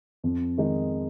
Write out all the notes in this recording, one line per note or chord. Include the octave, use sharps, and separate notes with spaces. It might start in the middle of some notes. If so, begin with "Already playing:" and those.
F2
D#3 G#3 D#4